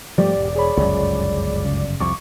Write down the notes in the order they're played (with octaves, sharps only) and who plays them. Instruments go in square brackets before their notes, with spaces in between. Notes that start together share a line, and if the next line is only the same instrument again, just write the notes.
[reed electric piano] G#2 G4 [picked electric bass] F3 G3 A3 [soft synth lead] D5
[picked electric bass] E1
[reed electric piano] G#4 C#5 B5
[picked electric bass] G1 F#2 [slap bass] C#2
[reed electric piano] C#3
[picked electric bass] C2 F2 [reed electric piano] C#6 D6